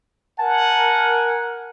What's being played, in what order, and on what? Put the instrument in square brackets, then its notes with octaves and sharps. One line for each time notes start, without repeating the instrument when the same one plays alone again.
[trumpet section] A#4 G#5 [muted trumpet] F#5 [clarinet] A5